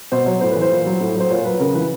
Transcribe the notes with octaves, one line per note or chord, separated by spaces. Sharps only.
B2 C5
F#3 C#5
A2 C5
B4
E3
C5
A#2
F#3
A2
F#3 C5
A#2 C#5
F#3 B4
C#3 A#4
E3 B4